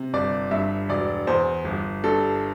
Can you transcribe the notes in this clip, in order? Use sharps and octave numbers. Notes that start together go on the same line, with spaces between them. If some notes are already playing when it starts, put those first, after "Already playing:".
Already playing: C3
G1 D5
G2 E5
E1 D5
E2 C5
G1
G2 A4